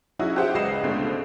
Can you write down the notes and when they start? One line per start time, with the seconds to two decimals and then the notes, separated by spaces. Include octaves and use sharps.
0.19 F#3 C#4 D#4 E4 F#4 G#4
0.36 G4 G#4 C5 E5 F#5
0.54 G#1 C#2 B4 D#5 C7 E7
0.83 C#2 G#2 B2 D3 A3 C4